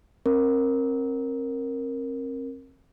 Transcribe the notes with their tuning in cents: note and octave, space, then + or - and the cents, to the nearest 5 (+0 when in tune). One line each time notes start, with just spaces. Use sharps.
C4 +40 A#4 +0